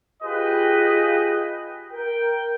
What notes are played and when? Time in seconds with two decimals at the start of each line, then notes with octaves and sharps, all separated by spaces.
0.23 F4 G4 G#4 B4 D#5 G5
1.92 A#4 G5